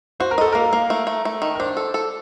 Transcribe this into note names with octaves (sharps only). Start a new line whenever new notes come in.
F#4 C5
A#4
A4 D#5
A#3 A#4
A#3
A3
A3
A3
D#3
A#4
D4 C5
A4
A4